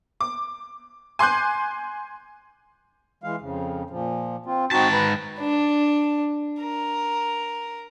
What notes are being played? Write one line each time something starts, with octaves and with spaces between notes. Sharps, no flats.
D6
G#5 C6 D6 F#6 G6
E3 G#3 F5
F2 C#3
A#2 F3
C4 F4
G#2 C4 D#4 F#4 A5
B4 A#5
D4
A#4